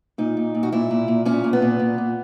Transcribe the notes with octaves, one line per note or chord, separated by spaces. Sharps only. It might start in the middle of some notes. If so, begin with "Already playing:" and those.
A#2 D#4
A#2
A#2
F#4
A#2 E4
A#2
A#2
A#2 C#4
A#2
B3
A#2
A#2
A#2